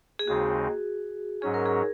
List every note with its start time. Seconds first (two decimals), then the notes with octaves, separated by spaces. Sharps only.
0.19 G#4
0.28 D#2 C#3 G#3 C4 D#4 F#4
1.42 G#2 F#3 C#4 G#4
1.54 A#4
1.66 G#4